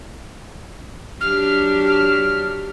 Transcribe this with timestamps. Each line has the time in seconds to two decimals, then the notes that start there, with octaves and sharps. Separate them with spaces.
1.21 F#3 D4 G4 F6
1.84 F6